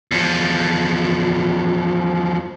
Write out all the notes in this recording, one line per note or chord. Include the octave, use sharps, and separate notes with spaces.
E2 F3